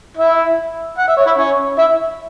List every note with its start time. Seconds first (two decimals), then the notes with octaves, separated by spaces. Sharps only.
0.17 E4 E5
0.98 F#5
1.08 E5
1.17 C#5
1.26 E4 E5
1.38 C#4 C#5
1.78 E4 E5